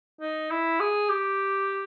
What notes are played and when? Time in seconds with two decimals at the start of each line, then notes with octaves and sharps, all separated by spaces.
0.21 D#4
0.51 E4
0.80 G#4
1.10 G4